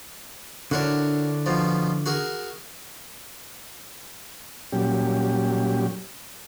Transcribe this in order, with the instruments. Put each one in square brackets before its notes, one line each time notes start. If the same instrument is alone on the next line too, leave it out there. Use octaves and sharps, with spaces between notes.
[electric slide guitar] D3 D4 E4 [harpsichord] F#4 A#4 C#5
[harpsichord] B2 F3
F#4 G#4 A#4
[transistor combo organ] A#2 F#3 G3 C#4 G4